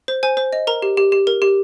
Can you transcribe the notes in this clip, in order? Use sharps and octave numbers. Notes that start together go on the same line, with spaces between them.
C5
C5 G#5
C5
D#5
A#4 A#5
G4
G4
G4
A#4
G4